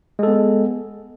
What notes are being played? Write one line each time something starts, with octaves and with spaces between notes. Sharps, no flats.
G#3 B3 A4